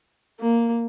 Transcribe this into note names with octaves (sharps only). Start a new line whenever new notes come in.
A#3